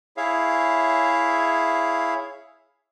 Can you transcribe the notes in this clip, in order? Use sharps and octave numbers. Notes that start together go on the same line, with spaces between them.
E4 G#4 C#5 E5 F5